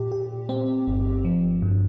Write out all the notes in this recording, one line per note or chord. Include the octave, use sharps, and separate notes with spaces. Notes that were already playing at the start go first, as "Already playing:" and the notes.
Already playing: A#2 G4
G4
C4
G1
F3
G2